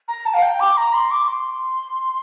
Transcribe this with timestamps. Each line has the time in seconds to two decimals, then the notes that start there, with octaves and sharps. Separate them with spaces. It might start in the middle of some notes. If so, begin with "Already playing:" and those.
0.08 A#5
0.26 A5
0.34 F5
0.42 G5
0.60 D6
0.77 A#5
0.94 C6
1.11 D6
1.28 C6